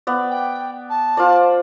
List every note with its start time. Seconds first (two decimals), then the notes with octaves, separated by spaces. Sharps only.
0.07 B3 D5
0.30 G5
0.90 A5
1.17 F4 C5 D5